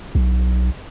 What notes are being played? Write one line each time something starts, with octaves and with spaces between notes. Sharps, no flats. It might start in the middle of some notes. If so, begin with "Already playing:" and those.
B1